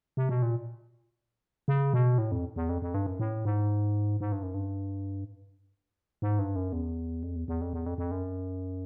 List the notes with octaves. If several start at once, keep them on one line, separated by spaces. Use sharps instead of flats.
C3
B2
A#2
C#3
B2
A2
F2
E2
F2
F2
G2
F#2
A2
G#2
G#2
G2
F#2
G2
G#2
G2
F#2
E2
F2
E2
E2
F2
E2
F2
F2
F#2